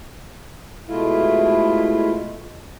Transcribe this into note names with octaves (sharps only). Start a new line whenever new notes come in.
B2 G#3 A3 E4 F4